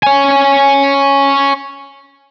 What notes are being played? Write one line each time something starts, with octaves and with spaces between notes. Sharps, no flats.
C#5 G#5